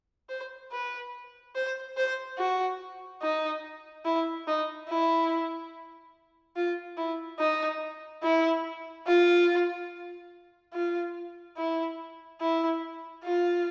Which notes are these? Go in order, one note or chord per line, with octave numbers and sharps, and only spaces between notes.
C5
B4
C5
C5
F#4
D#4
E4
D#4
E4
F4
E4
D#4
E4
F4
F4
E4
E4
F4